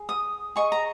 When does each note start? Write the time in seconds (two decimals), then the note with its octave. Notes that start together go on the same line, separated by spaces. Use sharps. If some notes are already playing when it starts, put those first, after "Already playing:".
Already playing: G#4
0.09 D#6
0.56 G#4 D#5 C#6
0.72 A#5